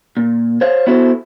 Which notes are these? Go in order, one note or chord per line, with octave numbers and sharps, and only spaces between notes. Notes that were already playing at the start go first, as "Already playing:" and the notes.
A#2
C5 C#5 F5
B3 E4 F#4 A4 C5